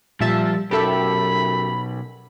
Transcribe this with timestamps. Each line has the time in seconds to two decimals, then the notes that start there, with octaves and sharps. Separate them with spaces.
0.21 A#2 F3 G3 E5 A5
0.71 B1 F#2 G4 A4 E5 B5